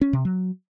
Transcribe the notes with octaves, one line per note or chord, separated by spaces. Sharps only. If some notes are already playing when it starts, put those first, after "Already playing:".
C#4
C3
F#3